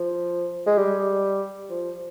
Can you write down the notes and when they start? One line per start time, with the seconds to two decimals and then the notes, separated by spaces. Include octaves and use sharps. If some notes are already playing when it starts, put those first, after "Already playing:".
Already playing: F3
0.67 G#3
0.78 G3
1.70 F3